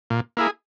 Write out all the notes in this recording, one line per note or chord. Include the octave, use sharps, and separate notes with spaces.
A#2
A#3 E4 G#4